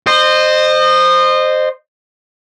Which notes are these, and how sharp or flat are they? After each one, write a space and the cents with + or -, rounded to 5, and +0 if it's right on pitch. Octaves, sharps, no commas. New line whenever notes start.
C5 +0 D#5 -25